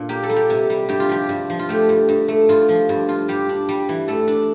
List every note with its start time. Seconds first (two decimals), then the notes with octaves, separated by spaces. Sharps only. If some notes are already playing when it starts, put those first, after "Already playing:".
Already playing: A#2 D4 F4
0.09 A#3 G4
0.23 A4
0.29 G3
0.36 G4
0.50 C3
0.70 G3
0.89 G2 G4
1.00 F4
1.09 F3 G4
1.29 G2
1.50 F3
1.59 F4
1.69 A3 G4
1.89 G2
2.09 G2
2.28 A3
2.49 G2 F4
2.69 F3
2.89 G2
3.09 F4
3.28 G3 G4
3.49 D4
3.69 G3
3.89 E3
4.08 A3 A4
4.28 D4